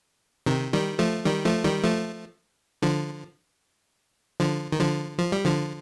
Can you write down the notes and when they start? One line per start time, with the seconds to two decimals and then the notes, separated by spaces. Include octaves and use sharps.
0.46 C3 D#3
0.72 D#3 G3
0.99 F3 A3
1.25 D#3 G3
1.45 F3 A3
1.64 D#3 G3
1.84 F3 A3
2.82 D3 F3
4.40 D3 F3
4.72 D#3
4.79 D3 F3
5.19 F3
5.32 G3
5.45 D3 F3